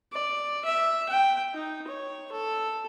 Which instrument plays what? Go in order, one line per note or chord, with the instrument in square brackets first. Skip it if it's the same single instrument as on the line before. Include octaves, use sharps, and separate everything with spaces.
[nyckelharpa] D5
E5
G5
D#4
C#5
A4